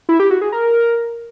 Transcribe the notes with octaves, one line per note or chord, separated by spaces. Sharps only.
E4
G4
F#4
G#4
A#4